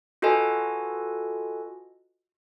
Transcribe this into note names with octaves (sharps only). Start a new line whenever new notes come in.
F4 F#4 A4 B4 D#5 G#5